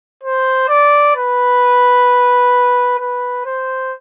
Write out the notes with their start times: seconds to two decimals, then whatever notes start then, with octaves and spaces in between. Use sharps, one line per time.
0.23 C5
0.69 D5
1.15 B4
2.99 B4
3.46 C5